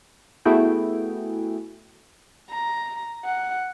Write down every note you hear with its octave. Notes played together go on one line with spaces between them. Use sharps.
A3 B3 E4 F#4 G#4 G5
A#5
F#5